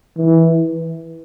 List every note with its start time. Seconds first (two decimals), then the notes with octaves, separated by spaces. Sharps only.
0.17 E3